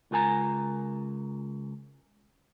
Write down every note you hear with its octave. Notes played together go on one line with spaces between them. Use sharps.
C#2 F4 A#4 G#5 A#5